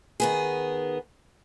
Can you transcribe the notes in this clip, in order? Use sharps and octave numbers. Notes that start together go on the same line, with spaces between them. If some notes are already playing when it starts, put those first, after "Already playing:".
D#3 B3 G#4